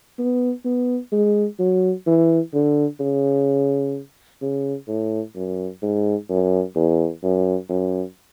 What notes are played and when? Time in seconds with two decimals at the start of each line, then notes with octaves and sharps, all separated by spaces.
0.19 B3
0.65 B3
1.12 G#3
1.59 F#3
2.07 E3
2.53 D3
3.00 C#3
4.42 C#3
4.88 A2
5.35 F#2
5.83 G#2
6.30 F#2
6.76 E2
7.23 F#2
7.70 F#2